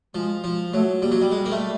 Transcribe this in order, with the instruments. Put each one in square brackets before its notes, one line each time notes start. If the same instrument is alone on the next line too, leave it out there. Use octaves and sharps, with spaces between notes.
[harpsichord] F3 [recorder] G#3
[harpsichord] F3
[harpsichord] F#3 [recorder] A3
[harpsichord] G3 [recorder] A#3
[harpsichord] F#3
G3
[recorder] G3 [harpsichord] G#3
[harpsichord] A#3
A3